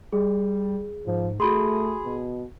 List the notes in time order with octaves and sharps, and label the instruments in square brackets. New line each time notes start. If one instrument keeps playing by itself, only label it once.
[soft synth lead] G3 [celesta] G#4
[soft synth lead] G#2 [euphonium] F3
[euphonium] A3 [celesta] F#4 B5 C6 [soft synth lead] G#4
[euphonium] B2